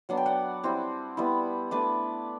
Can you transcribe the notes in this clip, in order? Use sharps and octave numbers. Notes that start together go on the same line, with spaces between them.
F#3 B3 D4 F#5
G5
D5 F#5
G3 C4 E4
G3 B3 E4
A3 D4 B4 D5